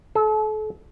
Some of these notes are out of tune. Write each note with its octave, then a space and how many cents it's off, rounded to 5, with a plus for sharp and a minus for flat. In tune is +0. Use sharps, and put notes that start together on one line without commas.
A4 -35